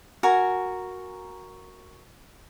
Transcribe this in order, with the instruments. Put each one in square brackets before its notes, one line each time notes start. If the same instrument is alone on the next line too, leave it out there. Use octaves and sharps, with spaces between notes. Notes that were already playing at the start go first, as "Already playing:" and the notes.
[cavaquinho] F#4 A#4 G#5 A#5